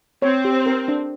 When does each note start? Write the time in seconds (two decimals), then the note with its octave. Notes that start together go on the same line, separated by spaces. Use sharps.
0.22 C4 C#5
0.45 G4
0.66 A#4
0.88 D4